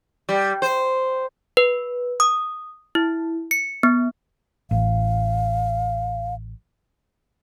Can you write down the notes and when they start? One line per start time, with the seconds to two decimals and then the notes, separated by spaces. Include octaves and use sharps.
0.29 G3
0.62 C5
1.57 B4
2.20 D#6
2.95 E4
3.51 C#7
3.83 B3
4.71 A1 F5